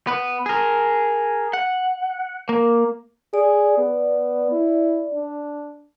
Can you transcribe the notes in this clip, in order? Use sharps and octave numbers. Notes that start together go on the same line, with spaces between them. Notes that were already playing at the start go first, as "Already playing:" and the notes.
B3 B4
G#4 A#4
F#5
A#3
G#4 D5
B3
E4
D4